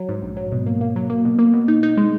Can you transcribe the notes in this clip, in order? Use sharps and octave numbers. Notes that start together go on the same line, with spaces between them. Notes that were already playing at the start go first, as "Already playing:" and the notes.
Already playing: F#3
G#2
A#1
F#3
B2
A#3
A#3
F#3
A#3
B2
A#3
B2
D#4
D#4
G#3